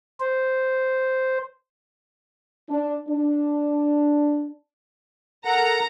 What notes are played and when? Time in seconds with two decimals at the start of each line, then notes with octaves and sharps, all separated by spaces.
0.20 C5
2.70 D4
3.09 D4
5.45 A4 A#4 F#5 A#5